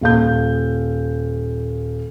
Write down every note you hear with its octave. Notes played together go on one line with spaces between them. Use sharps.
D#1 F5 G6